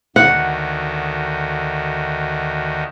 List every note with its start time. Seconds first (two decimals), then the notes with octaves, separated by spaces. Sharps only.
0.16 D2 D#3 F#4 F#5